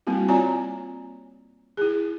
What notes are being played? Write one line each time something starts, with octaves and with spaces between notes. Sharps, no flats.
G3 A#3 C4 E4 F#4
C4 F4 C#5 D5 G#5 A#5
E4 G#4